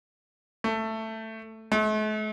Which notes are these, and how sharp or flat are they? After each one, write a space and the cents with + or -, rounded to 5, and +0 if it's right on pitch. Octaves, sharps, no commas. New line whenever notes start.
A3 +10
A3 -45